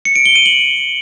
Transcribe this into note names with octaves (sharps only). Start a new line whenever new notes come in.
C#7
D7
G7
D#7
F#7